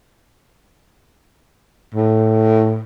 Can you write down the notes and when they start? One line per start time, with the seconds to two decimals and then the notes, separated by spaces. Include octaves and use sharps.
1.95 A2